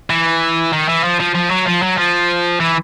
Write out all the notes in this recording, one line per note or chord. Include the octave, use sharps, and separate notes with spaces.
E3
D#3
E3
F3
F3
F3
F#3
F3
F#3
F3
E3